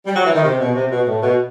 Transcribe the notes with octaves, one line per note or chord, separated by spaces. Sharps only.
G3
F#3
E3
D#3
C3
B2
C3
B2
A2
B2